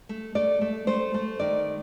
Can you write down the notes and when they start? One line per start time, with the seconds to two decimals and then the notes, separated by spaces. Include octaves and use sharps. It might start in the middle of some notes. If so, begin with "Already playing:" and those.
0.09 A3
0.35 A3 D5
0.61 A3
0.87 A3 C5
1.14 A3
1.40 D#3 D5